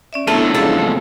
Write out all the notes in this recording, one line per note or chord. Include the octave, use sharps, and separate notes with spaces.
C#4 D5 E5
A#2 F#3 A3 B3 D4 E4 A4
F2 C#3 G#3 A4
A3